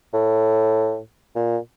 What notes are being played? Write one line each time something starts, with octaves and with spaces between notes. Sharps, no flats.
A2
A#2